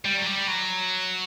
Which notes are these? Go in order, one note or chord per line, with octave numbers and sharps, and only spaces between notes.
G3
F#3
G3
F#3